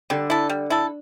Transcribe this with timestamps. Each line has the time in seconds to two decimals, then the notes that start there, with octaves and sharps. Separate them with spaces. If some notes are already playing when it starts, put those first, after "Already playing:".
0.10 D3 G3
0.30 E4 A4
0.49 G3
0.70 E4 A4